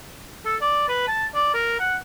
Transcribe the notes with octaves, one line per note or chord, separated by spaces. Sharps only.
A4
D5
B4
A5
D5
A#4
F#5